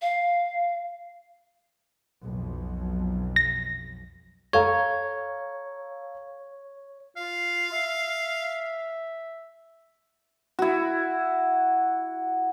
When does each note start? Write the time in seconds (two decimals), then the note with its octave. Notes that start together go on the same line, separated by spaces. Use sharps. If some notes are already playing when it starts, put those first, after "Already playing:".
0.02 F5
2.24 B1 F2
3.36 A#6
4.53 A4 C#5 F5 A#5
7.17 F4 F5
7.72 E5
10.59 E4 F#4